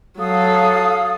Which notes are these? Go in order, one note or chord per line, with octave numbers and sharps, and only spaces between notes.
F#3 A4 F5 D#6